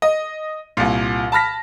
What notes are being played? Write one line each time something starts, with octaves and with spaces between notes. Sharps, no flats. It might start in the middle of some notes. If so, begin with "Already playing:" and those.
D#5
C2 A#2
A5 B5 F6 A#6 B6